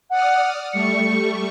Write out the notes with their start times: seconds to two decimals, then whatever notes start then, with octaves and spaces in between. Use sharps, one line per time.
0.10 D5 F#5 D#6 F6
0.73 G3 A3 C#6 C#7